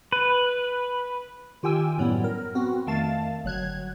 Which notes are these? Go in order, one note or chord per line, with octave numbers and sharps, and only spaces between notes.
B4
D#3 F4 G4 G5 G#5 E6
F#2 A2 F#3 G3 B3 E4
A#4
B3 C4 F#4
F2 D#3 A3 F5 A5 A6
G1 F#3 F#6 G#6